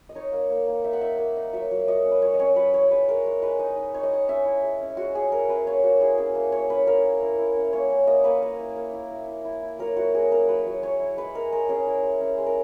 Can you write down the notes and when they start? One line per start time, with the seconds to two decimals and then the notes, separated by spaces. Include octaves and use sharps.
0.09 D#5
0.15 D#4 C#5
0.32 A#3
0.50 A#3
0.68 A#3
0.84 D#4 E5
0.93 F#5
1.01 D#4 E5
1.18 A#3
1.36 D#4
1.53 F#3 E5
1.71 F#3
1.87 F#3 D#5
2.04 C#4
2.11 B4
2.22 F#3 C#5
2.34 D#5
2.39 C#4 C#5
2.56 F#3 B4
2.74 E4 C#5
2.91 G#3 B4
3.09 G#3 A#4
3.26 G#3
3.42 G#3 B4
3.59 D#4 D#5
3.77 D#4
3.94 D#4 C#5
4.03 D#5
4.12 D#4 C#5
4.28 C#4 E5
4.45 E4
4.62 G#3
4.81 C#4
4.97 G#3 F#4
5.14 C#4 G#4
5.32 G#3 A#4
5.49 C#4 B4
5.67 A#3 C#5
5.83 A#3 F#4
6.01 E4 G#4
6.18 C#4 G#4
6.35 A#3
6.52 A#3 C#5
6.69 C#4 B4
6.87 A#3 A#4
7.04 A#3
7.21 E4
7.38 E4
7.56 C#4
7.73 A#3 C#5
7.90 C#4
8.07 A#3 D#5
8.24 A#3 B4
8.42 A#3
8.59 E4
8.76 A#3
8.93 E4
9.11 E4
9.28 E4
9.45 E4
9.63 E4
9.79 F#3 A#4
9.97 E4 F#4
10.14 F#3 G#4
10.31 C#4 A#4
10.48 F#3 B4
10.66 F#3
10.83 F#3 C#5
11.00 E4
11.17 G#3 B4
11.35 G#3 A#4
11.52 G#3 A#4
11.69 C#4 G#4
11.86 E4
12.03 G#3
12.21 C#4
12.38 G#3
12.46 A#4